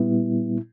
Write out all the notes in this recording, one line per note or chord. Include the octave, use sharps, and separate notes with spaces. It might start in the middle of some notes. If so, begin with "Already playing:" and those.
Already playing: A#2 G3 B3 E4